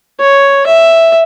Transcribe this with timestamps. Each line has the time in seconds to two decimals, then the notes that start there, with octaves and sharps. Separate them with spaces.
0.20 C#5
0.66 E5